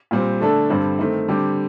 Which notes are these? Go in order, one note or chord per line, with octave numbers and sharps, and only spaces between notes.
A#2 G3 C4
D3 A3 D4 A4
G2 D3 G3 C4
D#3 A3 C4
D3 G3 C4 G4